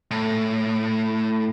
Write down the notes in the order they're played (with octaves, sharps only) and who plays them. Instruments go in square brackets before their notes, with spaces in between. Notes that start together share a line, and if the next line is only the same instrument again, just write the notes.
[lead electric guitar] A2